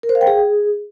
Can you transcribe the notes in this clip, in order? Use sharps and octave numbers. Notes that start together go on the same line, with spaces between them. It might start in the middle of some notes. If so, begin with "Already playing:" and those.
A#4
C5
F5
G5
G#4